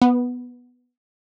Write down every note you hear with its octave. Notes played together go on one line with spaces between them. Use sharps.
B3